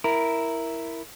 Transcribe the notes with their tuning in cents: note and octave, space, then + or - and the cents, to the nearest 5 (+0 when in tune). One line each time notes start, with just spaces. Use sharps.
E4 +0 A#4 +0